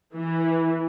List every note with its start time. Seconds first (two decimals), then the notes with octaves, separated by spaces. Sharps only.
0.16 E3